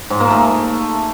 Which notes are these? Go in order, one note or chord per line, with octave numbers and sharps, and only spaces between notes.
G#2
A#3
A3